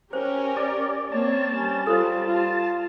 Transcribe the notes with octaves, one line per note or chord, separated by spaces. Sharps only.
C#4 G4 A#4 C5
D5
A#3 C4 C#5 A5
G3 C#4
F4 A4 C5
F4